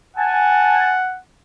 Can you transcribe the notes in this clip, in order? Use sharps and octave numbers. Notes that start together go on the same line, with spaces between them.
F#5 G#5 A5